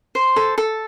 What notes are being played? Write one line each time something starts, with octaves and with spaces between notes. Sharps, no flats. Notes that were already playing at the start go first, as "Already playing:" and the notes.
C5
A4
A4